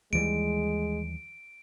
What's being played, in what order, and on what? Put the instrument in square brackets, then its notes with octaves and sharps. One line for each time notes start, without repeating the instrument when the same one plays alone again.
[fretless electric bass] D#2 E3 G3 [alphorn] G#3 [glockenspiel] D7